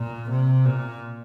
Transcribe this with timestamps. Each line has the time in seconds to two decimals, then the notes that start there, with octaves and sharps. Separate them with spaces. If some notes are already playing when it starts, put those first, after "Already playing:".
Already playing: A#2
0.30 C3
0.65 A#2